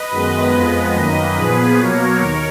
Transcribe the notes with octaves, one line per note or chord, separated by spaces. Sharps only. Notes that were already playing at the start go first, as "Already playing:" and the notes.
Already playing: B4 D#5
F#2 D#3 G#3 B3
F2 F3 G#3 B3
F#2 D#3 A#3 B4 D#5
A#2 F3 B3 G#4 B4
B2 F#3 A#3 A#4 C#5
D#2